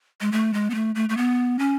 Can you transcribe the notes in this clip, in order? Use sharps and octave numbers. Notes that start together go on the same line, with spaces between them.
G#3
A3
G#3
B3
A3
A3
A3
B3
C#4